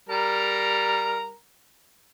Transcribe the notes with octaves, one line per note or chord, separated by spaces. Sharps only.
G3 A#4 A#5